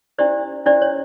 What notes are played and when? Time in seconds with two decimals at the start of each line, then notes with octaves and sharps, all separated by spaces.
0.18 C#4 E4 G4 C5 D5
0.66 C#4 E4 G4 C5 D5
0.82 C#5